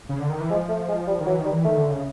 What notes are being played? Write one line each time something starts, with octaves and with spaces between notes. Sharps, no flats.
C#3
D3
D#3
E3
F3 G#3
A3
G#3
G3
D#3
E3 F#3
D#3
G3
E3
D#3 A3
D3
C#3